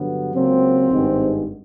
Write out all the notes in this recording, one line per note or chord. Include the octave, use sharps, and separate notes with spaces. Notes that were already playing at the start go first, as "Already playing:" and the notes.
Already playing: G2 D3 F#3 B3
C#2 C#3 F#3 A#3 C4
G#1 G2 D#3 G#3 B3